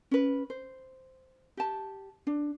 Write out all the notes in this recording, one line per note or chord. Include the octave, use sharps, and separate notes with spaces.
C#4 B4
C5
G4 A5
D4